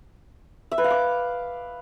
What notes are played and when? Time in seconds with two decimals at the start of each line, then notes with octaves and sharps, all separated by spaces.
0.71 E5
0.78 B4
0.84 F5
0.90 D6